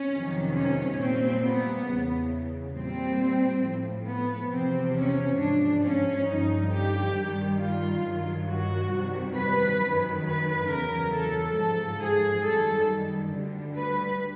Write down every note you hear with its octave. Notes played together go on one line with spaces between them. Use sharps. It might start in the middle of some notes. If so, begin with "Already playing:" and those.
Already playing: C#4
F2 C3 D#3 F#3
C#4
A#2 G3 C4
B3
E2 C#3 E3
A#2 G3 C4
A2 F3
B3
E2 C3 F3 C4
C#4
G#2 F3 D4
C#4
G2 D3 F3 D#4
G4
G2 D#3 G3
F4
G2 D#3 F#3
F#4
F2 C3 D#3 G3
B4
F#2 D#3 F#3
B4
E2 C#3 F#3 A#4
A4
G#2 F3 A4
G#4
F#2 D#3 G3 A4
D2 D3 G3
B4